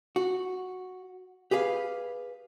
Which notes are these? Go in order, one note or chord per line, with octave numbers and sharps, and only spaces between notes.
F#4
G4 G#4 B4 F5